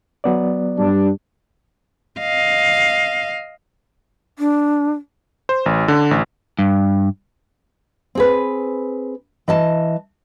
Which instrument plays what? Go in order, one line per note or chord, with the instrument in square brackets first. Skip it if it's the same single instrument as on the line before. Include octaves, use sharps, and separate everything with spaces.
[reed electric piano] F#3 B3 D5
[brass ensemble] G2 D4
[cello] D#5 F5
[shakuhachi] D4
[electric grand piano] C5
A1
D3
A1
[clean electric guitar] G2
[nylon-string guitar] C4 G#4 B4
E3 D#5 A5